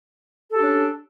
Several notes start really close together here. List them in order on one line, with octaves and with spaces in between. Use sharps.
A4 G4 D4 C#4